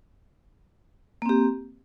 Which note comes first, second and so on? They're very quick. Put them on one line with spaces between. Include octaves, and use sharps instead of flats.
A#3 C4 G4